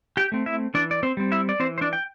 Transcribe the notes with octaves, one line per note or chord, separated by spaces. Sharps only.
G4 G5
A3 C4
E4 E5
E3 D4 D5
D5
C4 C5
G3 C4
E4 E5
D5
E3 C4 C5
C5
D4 D5
G5